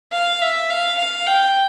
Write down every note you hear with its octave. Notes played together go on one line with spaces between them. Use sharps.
F5
E5
F5
F5
G5